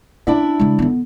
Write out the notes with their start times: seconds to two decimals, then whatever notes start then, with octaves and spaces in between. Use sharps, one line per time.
0.27 C#4 D4 E4 E5
0.60 C#3 G#3
0.79 D3 B3